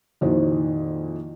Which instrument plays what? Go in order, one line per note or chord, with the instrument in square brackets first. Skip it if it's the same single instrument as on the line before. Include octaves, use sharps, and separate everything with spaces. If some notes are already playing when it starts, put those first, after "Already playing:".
[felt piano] F2 A#2 D#3 E4 F#4 C5